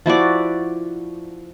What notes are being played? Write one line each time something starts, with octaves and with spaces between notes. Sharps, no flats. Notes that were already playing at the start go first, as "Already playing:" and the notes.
F3 E4 F#4 D5